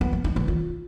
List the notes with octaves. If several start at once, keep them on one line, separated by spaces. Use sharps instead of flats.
B3
F3
D#4
E3
F4